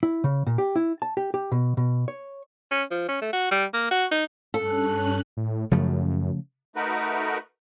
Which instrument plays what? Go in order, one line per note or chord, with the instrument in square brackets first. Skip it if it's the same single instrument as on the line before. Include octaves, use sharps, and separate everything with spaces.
[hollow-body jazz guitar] E4
C#3
A#2
G4
E4
A5
G4
G4
B2
B2
C#5
[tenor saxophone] C#4
F3
C#4
A3
F#4
G3
A#3
F#4
D#4
[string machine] G2 C#4 F#6 [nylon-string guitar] A4
[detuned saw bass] A2
[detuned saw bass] F#2 [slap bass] C#3 F3 A3
[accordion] A3 D#4 F#4 A#4 B4